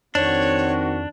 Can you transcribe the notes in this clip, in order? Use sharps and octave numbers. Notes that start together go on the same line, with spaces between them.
F2 D#3 C4 D4 F#4 C#5